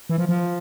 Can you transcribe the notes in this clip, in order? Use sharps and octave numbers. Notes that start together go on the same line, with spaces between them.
E3
F3
F3